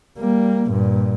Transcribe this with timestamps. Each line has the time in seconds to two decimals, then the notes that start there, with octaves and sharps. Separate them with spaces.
0.19 G3 A#3
0.70 G2 A#2